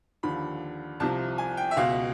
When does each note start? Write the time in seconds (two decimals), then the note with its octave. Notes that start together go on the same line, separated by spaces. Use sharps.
0.23 D#2 D3 F3 B5
1.00 C2 C3 F3 A5
1.38 G#5
1.57 G5
1.71 E5
1.76 C#2 B2 F5